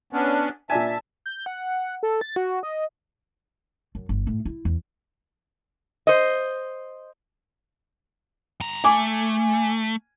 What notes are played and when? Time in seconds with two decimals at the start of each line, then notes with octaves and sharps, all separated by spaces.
0.13 B3 C#4 D4
0.70 A#2 D4 E5 G#5 A5
1.26 G6
1.46 F#5
2.03 A4
2.21 A6
2.36 F#4
2.63 D#5
3.95 F#2
4.09 G1
4.27 A2
4.45 E4
4.65 E2
6.07 C5 D#5
8.60 G2 A#5
8.84 A3 G#5 D6